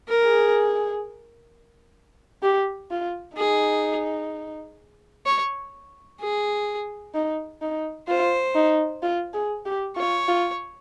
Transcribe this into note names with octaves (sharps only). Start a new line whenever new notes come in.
A#4
G#4
G4
F4
D#4 G#4
C#5
G#4
D#4
D#4
F4 C5
D#4
F4
G#4
G4
F4 C#5
F4